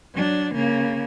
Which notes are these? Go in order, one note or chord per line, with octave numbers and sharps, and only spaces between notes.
F#3 D4
C#3 A#3